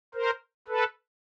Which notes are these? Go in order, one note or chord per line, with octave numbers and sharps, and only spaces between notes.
A#4 C5
A4 B4